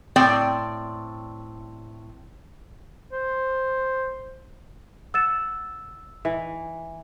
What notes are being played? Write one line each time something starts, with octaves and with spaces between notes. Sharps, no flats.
A2 C4 D5 G5
C5
F#5 E6 A6 E7
E3